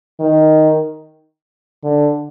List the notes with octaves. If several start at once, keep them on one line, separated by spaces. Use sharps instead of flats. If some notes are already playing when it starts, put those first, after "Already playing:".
D#3
D3